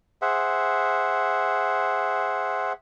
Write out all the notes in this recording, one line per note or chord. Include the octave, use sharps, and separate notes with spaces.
G#4 C5 E5 F#5